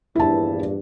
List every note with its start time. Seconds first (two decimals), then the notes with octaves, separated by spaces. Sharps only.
0.15 A#1 E2 G2 E4 A5